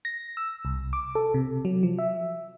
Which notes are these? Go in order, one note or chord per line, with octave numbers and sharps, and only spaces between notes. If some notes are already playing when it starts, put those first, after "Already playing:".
A#6
E6
C2
D6
A4
C3
F#3
F3
E5